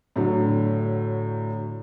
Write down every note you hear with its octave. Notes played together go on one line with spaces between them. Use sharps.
A2 D3 F#3